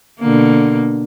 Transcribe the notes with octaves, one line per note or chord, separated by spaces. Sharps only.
B2 D3 A#3